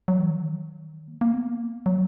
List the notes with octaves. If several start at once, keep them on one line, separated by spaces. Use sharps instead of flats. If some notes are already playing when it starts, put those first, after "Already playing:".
F#3
E3
D#3
A#3
A#3
B3
A#3
F#3